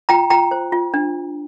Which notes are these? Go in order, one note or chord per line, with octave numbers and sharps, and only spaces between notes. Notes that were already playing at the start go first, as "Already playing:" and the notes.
F4 G5 A#5
F4 G5 A#5
C5
F4
D4